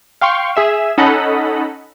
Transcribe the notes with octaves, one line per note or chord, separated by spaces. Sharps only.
F5 G5 C6 C#6
G#4 E5 E7
C#4 D#4 A4 D#5 F#5 B5